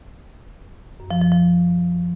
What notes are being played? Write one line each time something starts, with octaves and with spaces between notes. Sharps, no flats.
F#2
F3
F3
F3